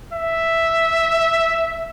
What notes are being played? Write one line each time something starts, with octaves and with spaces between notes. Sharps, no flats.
E5